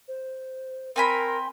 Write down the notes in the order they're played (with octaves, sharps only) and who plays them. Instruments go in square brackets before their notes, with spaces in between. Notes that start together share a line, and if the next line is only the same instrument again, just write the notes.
[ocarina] C5
[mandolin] C4 G#5 B5 [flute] A#4 [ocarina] C6
[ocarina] C6